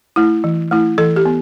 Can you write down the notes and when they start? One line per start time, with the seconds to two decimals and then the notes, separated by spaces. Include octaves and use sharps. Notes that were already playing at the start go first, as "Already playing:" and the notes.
0.16 A3 E4
0.44 E3
0.71 A3 E4
0.98 E3 A4
1.16 G4
1.25 B3